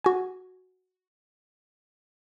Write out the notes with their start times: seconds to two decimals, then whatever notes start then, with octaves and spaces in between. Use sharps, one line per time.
0.04 F#4 G#5